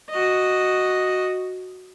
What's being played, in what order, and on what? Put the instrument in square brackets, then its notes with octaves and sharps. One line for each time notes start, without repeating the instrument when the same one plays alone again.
[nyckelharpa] F#4 D#5